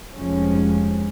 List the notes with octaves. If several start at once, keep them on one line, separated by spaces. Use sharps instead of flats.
F1 F2 F3 G#3 C#4